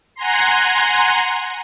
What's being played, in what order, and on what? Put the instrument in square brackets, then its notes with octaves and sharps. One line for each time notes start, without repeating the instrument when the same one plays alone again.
[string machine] F#5 G#5 A#5 C6